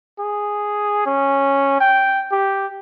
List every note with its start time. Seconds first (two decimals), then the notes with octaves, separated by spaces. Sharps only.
0.19 G#4
1.06 C#4
1.80 G5
2.32 G4